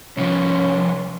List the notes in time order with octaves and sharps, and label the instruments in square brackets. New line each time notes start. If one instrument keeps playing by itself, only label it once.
[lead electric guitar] C2 F3 [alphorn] C#4